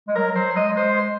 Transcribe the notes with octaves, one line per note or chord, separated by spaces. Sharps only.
G#3
F#3 A#4
F#3 C5
G#3 D#5
G#3 C5